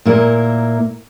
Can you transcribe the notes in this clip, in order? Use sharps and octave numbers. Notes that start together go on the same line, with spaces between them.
A#2 A#3 E4 A#4